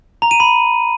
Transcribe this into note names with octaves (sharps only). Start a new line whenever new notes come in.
A#5
D#7
B5